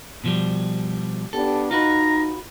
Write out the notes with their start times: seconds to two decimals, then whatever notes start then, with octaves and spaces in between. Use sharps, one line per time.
0.24 B2 F3 G3
1.33 B3 D4 G4 A4
1.71 D#4 F4 F#4 B4 A#5